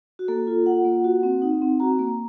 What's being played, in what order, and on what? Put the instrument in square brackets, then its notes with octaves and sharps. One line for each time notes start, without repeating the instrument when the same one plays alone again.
[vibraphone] F#4
A#3 A4
F4
F4 F#5
A#3
F#4
C4
D#4
C4
F#4 A#5
A#3